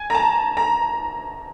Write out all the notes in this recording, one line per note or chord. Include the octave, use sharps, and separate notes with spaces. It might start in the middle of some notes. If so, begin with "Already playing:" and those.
Already playing: G#5
A#5
A5
A#5